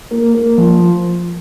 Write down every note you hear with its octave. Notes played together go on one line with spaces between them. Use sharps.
A#3
A#3
F3